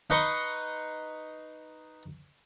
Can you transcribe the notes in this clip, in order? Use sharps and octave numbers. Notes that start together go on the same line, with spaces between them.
D#4 B4 D#5 C6 C#6